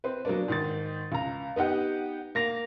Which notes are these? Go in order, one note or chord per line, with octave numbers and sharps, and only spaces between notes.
C4 B4
F#3 A#3 B3 D4
G#2 D#3 A6
C#2 A#5
B3 D#4 G4 F#5
A#3 A#6 F7